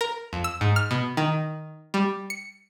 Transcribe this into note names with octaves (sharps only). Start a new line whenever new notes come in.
A#4
F2
E6
G#2
F6
B2
D#3
G3
C#7